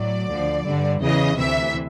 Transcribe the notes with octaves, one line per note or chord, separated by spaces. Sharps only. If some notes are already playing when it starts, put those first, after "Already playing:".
Already playing: A2 F#3 D5
D2 D3 F3
G2 D3 G3
E2 C#3 E3 D#5
D2 C3 E3 E5